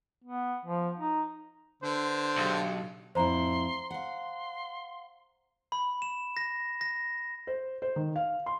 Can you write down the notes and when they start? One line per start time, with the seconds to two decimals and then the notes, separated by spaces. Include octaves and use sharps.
0.24 B3
0.65 F3
1.00 D#4
1.83 D3 D4 B4 C5
2.36 B1 G4 G#4 G5
3.15 F2 A2 E4 C5 A#5 C6
3.91 F5 F#5 C6
5.72 B5
6.02 E7
6.37 A#6
6.81 A#6
7.47 C5
7.82 C5
7.96 D#3
8.16 F5
8.46 C6